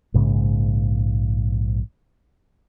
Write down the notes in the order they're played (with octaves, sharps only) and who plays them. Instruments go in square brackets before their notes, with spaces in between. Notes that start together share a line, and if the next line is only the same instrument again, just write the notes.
[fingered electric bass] A#1 G#2 C#3 G#3